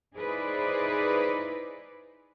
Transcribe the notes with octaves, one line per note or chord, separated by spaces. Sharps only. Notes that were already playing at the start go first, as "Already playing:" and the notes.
D#4 E4 G#4 B4 C5 D5